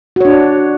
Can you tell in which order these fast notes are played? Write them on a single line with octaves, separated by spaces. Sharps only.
F#4 C#5 D4